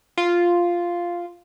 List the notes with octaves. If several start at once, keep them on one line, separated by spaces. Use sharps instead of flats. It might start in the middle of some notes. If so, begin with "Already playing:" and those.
F4